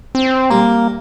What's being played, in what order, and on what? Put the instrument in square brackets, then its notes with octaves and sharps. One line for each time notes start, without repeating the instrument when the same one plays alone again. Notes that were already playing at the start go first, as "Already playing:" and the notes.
[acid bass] C4
[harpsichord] G3 [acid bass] A#3